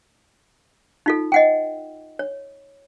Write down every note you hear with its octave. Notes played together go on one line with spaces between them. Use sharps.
D#4 F4 A4
D#5 F#5 G5
C#5